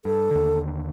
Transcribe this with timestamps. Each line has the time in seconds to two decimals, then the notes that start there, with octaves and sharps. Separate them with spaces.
0.05 G2 A4
0.31 D#2 D3